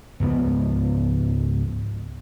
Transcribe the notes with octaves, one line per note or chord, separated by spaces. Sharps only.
C#2 G#2 F3 B3